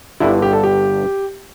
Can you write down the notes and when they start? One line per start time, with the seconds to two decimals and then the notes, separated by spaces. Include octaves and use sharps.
0.20 G1 G2 D3 E4
0.42 G4
0.53 A4
0.63 G4